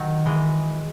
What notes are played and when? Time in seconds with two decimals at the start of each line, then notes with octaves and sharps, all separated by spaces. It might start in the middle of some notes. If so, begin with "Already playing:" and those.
Already playing: D#3 F#3
0.26 E3 G#3